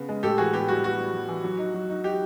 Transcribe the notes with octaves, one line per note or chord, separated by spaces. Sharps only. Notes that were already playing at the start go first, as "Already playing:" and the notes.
Already playing: C#3 B3
G#3
A2 G4 A4
E3 F#4 G#4
B3 G4
G3 F#4
B3 F#4
G3
G3
E3
F#3
D#4
F#3
D#4
D#4 G4